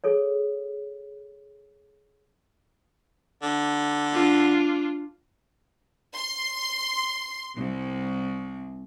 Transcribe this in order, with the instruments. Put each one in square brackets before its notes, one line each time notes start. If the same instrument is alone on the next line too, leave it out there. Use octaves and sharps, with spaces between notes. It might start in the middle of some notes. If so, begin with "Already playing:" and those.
[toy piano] G#4 A4 C#5
[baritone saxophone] D3
[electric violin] D4 F4
[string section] C6
C2